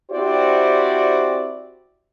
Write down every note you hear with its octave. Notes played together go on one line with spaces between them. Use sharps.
C4 E4 F#4 G4 C5 D5